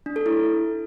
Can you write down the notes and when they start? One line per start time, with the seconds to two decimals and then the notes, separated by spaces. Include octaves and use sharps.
0.06 D4
0.16 A4
0.26 E4